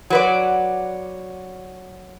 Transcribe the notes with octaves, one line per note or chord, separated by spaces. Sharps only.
F#3 B4 D5